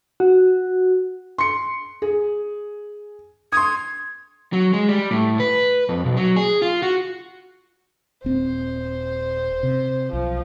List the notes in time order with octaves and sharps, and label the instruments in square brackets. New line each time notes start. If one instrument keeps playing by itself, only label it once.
[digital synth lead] F#4
[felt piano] C6 C#7
G#4
[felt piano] C6 D#6 [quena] G#6
[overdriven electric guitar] F#3
G#3
G3
A2
B4
F2
B1
F#3
G#4
F4
F#4
[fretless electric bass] D#1 C4 [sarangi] C5
[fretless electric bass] C3
[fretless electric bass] B1 [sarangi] F3